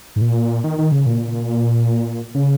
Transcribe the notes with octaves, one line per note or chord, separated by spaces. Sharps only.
G#2
A#2
D#3
D#3
C#3
A#2
C#3